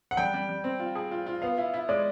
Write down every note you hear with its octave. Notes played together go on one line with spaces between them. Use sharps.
F#5
G3 G5
G3
G3
C4
F4
G#4
F4
F4
B3 F5
E4
E4
G#3 D5